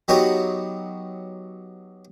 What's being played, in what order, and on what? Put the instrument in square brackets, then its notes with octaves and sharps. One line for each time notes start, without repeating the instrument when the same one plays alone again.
[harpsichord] F#3 B3 D#4 F#4 G4 C#5